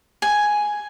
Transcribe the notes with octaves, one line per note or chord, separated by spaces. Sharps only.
G#5